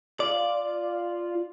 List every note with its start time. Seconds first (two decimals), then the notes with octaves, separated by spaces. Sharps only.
0.20 F4 D5